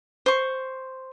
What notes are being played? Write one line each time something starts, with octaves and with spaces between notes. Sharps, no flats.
C5 C#6